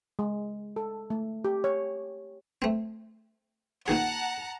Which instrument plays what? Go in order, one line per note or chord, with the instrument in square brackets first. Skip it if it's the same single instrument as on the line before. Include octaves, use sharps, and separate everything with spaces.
[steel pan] G#3
A4
A3
G4
C#5
[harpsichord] A3 C4
[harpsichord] A#2 D#3 G#4 [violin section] F#5 A5 A#5